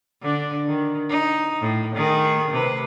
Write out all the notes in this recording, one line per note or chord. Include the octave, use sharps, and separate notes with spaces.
D3 D4
D#3
D#4
A2
D#3 A3 G#4
C3 B4